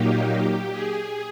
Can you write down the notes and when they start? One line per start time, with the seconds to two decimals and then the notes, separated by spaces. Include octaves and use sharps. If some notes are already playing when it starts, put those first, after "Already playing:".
Already playing: A#2 F#3 A#3 D#4 G4
0.72 G#4